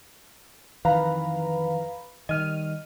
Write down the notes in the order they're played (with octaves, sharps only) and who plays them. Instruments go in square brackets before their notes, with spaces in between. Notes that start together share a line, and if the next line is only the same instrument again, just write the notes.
[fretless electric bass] F2 D#3 E3 [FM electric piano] B4 [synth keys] F5 A#5 B5
[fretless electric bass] D#3 G3 [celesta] D#5 [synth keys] F6 D#7